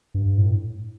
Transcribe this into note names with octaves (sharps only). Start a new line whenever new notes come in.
G2
A2